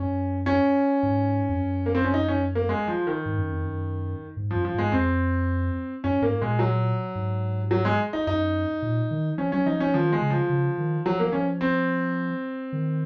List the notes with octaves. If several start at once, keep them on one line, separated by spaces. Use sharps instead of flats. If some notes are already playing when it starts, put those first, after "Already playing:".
Already playing: F#2 C#4
C#4
G#2
F2
F#2
A#3
C4
C#4
D#4
C#4
A#3
G#3
F3
D#3
G#2
F#2
F2
F#2
G#2
F#2 F3
F3
G#2 G#3
F2 C4
F#2 C#4
G#2 A#3
A#2 G#3
F#3
G#2
F#3
G#3
D#4
F#2 D#4
A#2
D#3
F3 C#4
F#3 C#4
F3 D#4
F3 C#4
D#3 F3
G#3
C#3
F3
C#3
D#3
F3 F#3
A#3
F3 C#4
C4
D#3